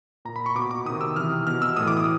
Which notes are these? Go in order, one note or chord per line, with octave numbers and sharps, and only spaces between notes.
A#2 A#5
B5
C#6
B2 D6
D6
C3 D#3 D#6
E6
C3 E3 F6
B2 F6
E6
A2 E3 D#6
D6
D#6